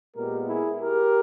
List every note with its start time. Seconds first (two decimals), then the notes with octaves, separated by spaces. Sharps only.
0.15 A#2 G#3 B3 G4 A#4
0.47 E4 G#4
0.78 G4 A#4